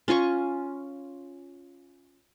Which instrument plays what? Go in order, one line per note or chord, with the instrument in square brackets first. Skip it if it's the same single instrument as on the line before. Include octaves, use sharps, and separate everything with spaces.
[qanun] C#4 F4 G#5 C#6